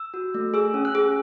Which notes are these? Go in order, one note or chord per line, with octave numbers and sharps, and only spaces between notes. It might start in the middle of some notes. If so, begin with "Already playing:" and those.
Already playing: E6
F#4
A3
G#4 E6
C#4
F#6
G#4